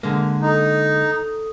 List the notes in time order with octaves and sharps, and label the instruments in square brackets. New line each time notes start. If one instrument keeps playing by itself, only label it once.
[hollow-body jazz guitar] D3 G#3 A#3
[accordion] D#4 [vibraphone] A4 D#6